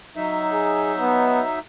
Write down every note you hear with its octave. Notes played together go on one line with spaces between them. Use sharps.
F#3 D#4 E5
G#4
B3